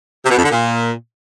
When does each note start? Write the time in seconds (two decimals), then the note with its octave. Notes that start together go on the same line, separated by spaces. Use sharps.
0.24 C3
0.31 B2
0.37 F2
0.44 D3
0.50 A#2